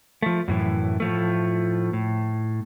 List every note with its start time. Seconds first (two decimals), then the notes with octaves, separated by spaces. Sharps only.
0.22 F3 A3
0.48 F#2 A2 E3
1.00 A2 F3 A3
1.93 A2